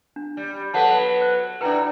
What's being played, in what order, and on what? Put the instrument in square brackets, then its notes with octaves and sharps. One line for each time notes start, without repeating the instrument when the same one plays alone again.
[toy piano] D4
[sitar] G3
[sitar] F#3 B3 B4 [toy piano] A4 F#5 A5
[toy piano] C5
[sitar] D4 E4 F#4 [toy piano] B4 G5 A#5